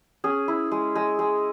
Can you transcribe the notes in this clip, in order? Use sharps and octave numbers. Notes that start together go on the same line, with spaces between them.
C#4 G#4
E4
G#3
G#3
G#3